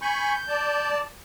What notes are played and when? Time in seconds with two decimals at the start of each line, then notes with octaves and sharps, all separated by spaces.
0.02 G#5 B5 C#6 G6
0.48 D5 A5